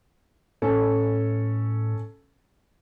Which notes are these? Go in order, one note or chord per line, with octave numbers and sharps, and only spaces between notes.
A2 C#4 A4